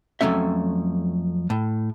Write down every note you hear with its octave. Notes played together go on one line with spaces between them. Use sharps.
F2 F#3 A3 C#4 E5
A2